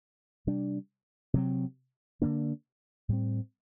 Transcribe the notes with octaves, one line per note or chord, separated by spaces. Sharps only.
C3 G3 D4
C3 F#3 C4
D3 F#3 A#3 D4
A2 G3 C4